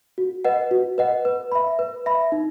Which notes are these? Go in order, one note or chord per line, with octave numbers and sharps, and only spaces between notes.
F#4
B4 D#5 F#5
F#4
B4 D#5 F#5
B4
E5 B5
B4
E5 B5
D#4